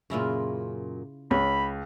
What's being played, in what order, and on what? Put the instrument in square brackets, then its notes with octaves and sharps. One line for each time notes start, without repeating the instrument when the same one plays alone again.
[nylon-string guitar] F#2 A#2 [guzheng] C#3 E4 F4
[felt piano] C#2 [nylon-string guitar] C#5 [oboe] B5